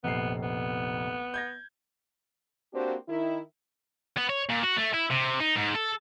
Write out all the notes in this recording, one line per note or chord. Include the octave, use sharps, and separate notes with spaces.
F1 A#1 B3 C7
B3
G6 G#6 A#6
A#3 C4 D4 F#4 G4 C5
D#3 E4
B3
C#5
A#2
F#4
A3
E4
C3
D#4
G#2
A4